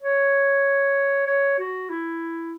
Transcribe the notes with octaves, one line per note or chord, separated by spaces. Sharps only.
C#5
C#5
F#4
E4